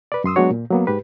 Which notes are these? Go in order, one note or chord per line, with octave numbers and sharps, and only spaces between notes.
B4 D5
F#2 C6 D#6 E6
F#3 G#3 B3 D4 F#4 C#5
A#2
F#3 A#3 B3
G#2 G4 B4